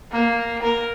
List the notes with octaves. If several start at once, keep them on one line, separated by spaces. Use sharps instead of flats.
A#3
A#4